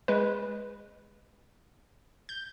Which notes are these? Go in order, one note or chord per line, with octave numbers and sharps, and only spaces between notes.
G#3 B4
G6